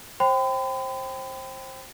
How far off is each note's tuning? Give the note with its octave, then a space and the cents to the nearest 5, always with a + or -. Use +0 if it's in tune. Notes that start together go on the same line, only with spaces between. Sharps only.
C5 +25 G5 +0 B5 +45